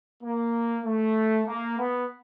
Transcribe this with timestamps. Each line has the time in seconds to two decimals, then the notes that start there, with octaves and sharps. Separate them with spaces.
0.22 A#3
0.85 A3
1.47 A#3
1.78 B3